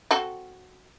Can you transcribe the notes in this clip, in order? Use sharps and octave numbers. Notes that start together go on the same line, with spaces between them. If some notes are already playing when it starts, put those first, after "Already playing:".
C4 F#4 A4